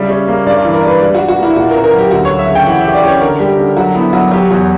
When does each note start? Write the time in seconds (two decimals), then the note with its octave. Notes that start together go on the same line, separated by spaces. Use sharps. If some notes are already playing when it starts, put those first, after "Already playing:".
Already playing: C#3 G3 E5
0.10 C#4
0.28 A#3
0.46 G2 D5
0.65 E3
0.73 A#4
0.83 D4 B4
1.01 G3
1.15 F#4
1.20 G3
1.28 F#4
1.38 A#3 E4
1.56 A#2 F#4
1.71 C#4 A#4
1.84 A#4
1.93 F#3
1.98 G4
2.11 D2 F#4
2.25 C#5
2.30 F#3
2.39 E5
2.48 C#3
2.55 G5
2.66 E3 F#5
2.80 G4 E5
2.95 D5
3.03 C#4 C#5
3.22 D3 A#4
3.40 G3 G4
3.59 D3
3.77 F#3 F#4
3.95 B3 E4
4.13 F#3 F#4
4.32 F#3 G4
4.50 E2 F#4